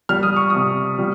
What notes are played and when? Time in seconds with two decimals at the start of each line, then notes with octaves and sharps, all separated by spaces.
0.09 G3 F6
0.23 D#6
0.36 C#6
0.50 C3 D#6
0.99 G3